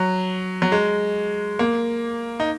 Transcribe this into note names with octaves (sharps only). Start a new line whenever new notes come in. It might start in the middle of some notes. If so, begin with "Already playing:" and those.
Already playing: F#3
F#3
G#3
A#3
D#4